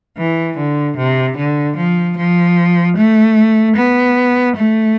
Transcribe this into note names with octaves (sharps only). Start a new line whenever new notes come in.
E3
D3
C3
D3
F3
F3
A3
B3
A3